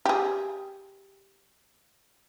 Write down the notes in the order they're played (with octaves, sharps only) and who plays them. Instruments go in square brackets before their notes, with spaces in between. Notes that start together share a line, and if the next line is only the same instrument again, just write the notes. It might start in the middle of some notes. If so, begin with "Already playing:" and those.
[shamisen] G4 G#4